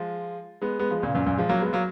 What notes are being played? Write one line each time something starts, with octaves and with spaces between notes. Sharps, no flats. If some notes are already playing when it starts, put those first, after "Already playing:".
Already playing: F3 G#3
G#3 B3
G#3 B3
F3 G#3
A#2 C#3
F#2 A#2
F#2 A#2
F3 G#3
F#3 A#3
G#3 B3
F#3 A#3